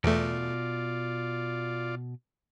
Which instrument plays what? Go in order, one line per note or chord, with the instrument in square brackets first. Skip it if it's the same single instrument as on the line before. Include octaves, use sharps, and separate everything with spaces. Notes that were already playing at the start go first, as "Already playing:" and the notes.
[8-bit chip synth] E2 A3 [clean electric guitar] B2 [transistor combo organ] F4 D5